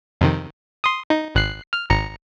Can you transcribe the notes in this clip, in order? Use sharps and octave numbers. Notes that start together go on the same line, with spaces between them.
F2 C3 D#3
C6 D#6
D#4
G#1 F#6 C7
F6
G#1 A#5 C#7